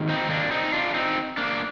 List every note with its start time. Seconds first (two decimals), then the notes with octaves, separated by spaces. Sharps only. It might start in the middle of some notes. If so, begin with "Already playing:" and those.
Already playing: G#2 D#3 A#3
0.09 C4 D#4
0.30 A#3 D4
0.51 C4 D#4
0.73 D4 F4
0.94 C4 D#4
1.37 A#3 D4